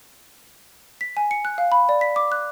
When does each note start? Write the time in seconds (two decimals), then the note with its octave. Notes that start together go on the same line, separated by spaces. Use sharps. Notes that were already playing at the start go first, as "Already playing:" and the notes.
1.01 B6
1.17 G#5
1.31 C#7
1.45 F#6
1.58 F5
1.72 B5
1.89 D5
2.01 B6
2.16 D6
2.32 F#6